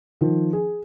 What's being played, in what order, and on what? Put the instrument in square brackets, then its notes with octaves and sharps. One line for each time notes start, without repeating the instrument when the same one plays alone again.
[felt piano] D#3 F3
G#4